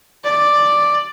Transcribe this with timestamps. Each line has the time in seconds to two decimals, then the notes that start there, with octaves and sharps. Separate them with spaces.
0.24 D5